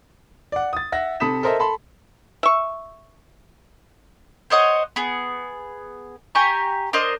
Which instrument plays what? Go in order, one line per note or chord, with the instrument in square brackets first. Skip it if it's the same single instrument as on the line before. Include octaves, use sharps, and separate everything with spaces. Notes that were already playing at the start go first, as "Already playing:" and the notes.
[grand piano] D5 F#5
D#6 A6
E5 F#5 A#6
C3 A4 B5 D#6 B6 E7
A4 A#4 C5 D#5 E5
A4 A5 B5 C6
[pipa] E5 C#6
[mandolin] C5 C#5 D#5 F#5
B3 G#4
G4 G#5 A#5 C#6
D4 A#4 C5 D#5